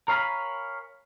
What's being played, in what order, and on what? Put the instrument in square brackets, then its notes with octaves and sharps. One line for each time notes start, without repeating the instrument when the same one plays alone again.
[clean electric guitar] A#4 C#5 F5 G#5 A#5 B5